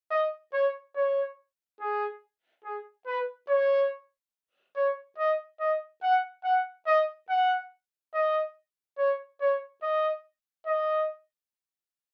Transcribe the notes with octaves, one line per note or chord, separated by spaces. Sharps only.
D#5
C#5
C#5
G#4
G#4
B4
C#5
C#5
D#5
D#5
F#5
F#5
D#5
F#5
D#5
C#5
C#5
D#5
D#5